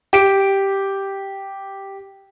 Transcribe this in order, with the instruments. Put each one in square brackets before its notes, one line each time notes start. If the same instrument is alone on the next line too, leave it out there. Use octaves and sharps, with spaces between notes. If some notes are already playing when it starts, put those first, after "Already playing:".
[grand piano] G4 D7